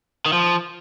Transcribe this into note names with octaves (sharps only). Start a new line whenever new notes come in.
D#3
F3